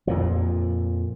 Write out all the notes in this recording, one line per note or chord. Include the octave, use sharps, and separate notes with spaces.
F2 A#2 F3